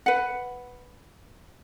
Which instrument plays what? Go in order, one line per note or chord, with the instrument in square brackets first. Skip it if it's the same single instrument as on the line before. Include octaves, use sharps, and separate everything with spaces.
[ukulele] B4 F#5